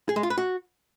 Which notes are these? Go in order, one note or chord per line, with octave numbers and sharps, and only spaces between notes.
G#4
G#3
F4
B4
F#4